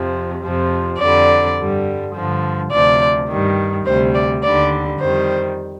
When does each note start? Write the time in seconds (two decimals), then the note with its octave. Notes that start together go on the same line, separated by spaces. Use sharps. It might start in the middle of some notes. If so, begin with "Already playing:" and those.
Already playing: F2 C3 F3
0.44 F2 C3 F3
1.01 F2 D3 G3 D5
1.59 G2 D3 G3
2.15 G2 D3 F3
2.72 D2 C3 F3 D5
3.30 G2 D#3 G3
3.85 D2 C3 G3 C5
4.15 D5
4.43 D#2 D3 G3 D5
5.00 F2 D#3 G3 C5